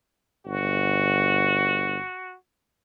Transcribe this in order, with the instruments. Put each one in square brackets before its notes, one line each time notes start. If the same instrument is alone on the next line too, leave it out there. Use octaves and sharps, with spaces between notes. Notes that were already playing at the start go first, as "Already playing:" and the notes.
[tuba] G1 [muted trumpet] F#4